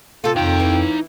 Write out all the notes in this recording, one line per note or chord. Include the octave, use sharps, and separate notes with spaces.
C3 F4 A4
F2 D#4 F5 G5
E3